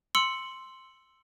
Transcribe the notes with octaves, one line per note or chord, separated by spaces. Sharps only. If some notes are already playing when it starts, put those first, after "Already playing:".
C6 E6 C#7 F#7